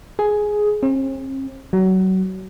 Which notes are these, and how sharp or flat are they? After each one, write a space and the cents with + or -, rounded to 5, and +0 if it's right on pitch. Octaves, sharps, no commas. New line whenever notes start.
G#4 +10
C4 +45
F#3 +25